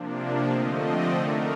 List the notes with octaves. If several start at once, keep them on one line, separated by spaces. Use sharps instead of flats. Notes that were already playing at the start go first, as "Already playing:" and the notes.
Already playing: C3 F3 A#3 D4
D3 F3 A3 C4 D#5
D5
D3 A3 D#4 A#4